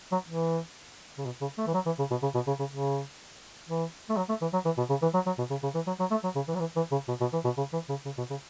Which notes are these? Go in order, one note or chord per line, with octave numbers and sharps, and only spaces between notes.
F#3
E3
C#3
B2
C#3
A3
E3
F#3
E3
C#3
B2
C#3
B2
C#3
C#3
C#3
E3
A3
F#3
A3
E3
F#3
E3
B2
C#3
E3
F#3
F#3
B2
C#3
C#3
E3
F#3
F#3
A3
F#3
C#3
E3
F#3
E3
E3
C#3
B2
B2
E3
B2
C#3
E3
C#3
C#3
B2
C#3